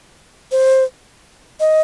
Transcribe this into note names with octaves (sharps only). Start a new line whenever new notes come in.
C5
D#5